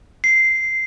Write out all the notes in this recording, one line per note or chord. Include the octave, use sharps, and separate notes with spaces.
C7